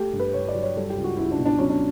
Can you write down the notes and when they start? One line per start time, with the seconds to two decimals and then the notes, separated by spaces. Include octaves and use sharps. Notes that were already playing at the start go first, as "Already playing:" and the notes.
Already playing: A3 G4
0.13 G2
0.19 B4
0.33 G2 C#5
0.48 D5
0.54 F#3
0.62 C#5
0.76 G3 A4
0.90 G4
0.96 C#2
1.04 F#4
1.17 C#2 E4
1.31 D4
1.38 B2
1.46 D4
1.59 F#3 C#4
1.69 D4